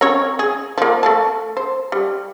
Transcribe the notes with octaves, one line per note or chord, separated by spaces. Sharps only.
C4 C#4 C#5
G#4
F3 A#3
A3 F5 A5
C5
G3